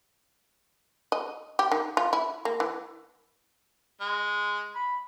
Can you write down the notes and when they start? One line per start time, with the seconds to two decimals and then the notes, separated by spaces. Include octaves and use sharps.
1.12 D#5
1.59 G4
1.72 D#3
1.97 F4
2.13 E4
2.45 A#3
2.60 E3
4.01 G#3
4.75 B5